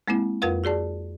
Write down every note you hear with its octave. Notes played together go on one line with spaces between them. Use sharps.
G#3 A#3 C4 E4
F2 F4 A#4 B4 F5
F#4 G#4 D5 A5